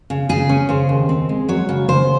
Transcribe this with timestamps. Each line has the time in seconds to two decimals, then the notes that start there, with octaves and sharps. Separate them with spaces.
0.10 C#3
0.29 C#3 G#4
0.49 C#4
0.69 C#3 C5
0.89 D#2
1.09 C4
1.29 G#3
1.49 F#3 C#5
1.69 C#3
1.88 C#3 C5